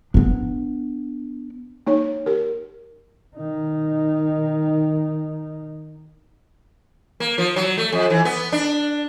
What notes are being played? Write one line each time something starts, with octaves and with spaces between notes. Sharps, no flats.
B3 D4
A#3 D#4 C#5
G4 A#4
D#3 D#4
A#3
F3
F#3
A3
F2
E3
B3
D4